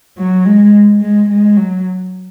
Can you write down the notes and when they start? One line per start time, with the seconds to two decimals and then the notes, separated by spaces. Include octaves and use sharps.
0.18 F#3
0.45 G#3
1.01 G#3
1.30 G#3
1.57 F#3